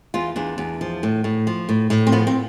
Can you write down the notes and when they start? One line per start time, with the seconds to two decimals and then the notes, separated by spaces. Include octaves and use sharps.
0.14 E2 F4
0.36 E2 D4
0.58 E2
0.81 F3
1.03 A2
1.24 A2
1.47 F3
1.69 A2
1.90 A2
2.07 C4
2.12 F3 B3
2.27 C4